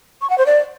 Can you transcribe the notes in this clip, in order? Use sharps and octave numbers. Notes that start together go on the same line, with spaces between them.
C#6
F#5
C5
D5